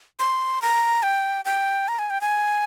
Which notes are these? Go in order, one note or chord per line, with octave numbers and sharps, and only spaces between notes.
C6
A#5
G5
G5
A#5
G#5
G5
G#5